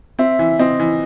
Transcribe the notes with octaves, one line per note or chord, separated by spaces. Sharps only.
C4 E5
E3
C4 D#5
E3